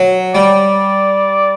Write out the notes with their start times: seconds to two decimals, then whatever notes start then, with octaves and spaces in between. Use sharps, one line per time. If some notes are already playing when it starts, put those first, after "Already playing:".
Already playing: F#3
0.35 G3 D5